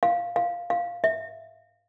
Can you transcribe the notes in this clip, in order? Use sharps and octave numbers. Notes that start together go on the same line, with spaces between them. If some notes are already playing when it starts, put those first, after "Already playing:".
F5
F5
F5
E5